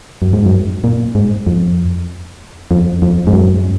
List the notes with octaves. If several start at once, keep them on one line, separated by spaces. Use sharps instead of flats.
F#2
G#2
F#2
A#2
G#2
F2
F2
F2
G#2
F#2